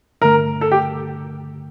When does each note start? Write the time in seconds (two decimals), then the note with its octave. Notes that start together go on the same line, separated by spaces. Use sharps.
0.21 G2 D3 A3 A#4
0.61 A4
0.72 G4